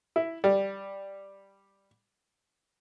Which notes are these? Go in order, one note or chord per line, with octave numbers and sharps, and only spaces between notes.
E4
G3